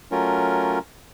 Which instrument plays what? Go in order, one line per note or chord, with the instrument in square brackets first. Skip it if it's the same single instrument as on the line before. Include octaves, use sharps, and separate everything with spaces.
[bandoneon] F#3 A3 C#4 F4 A#4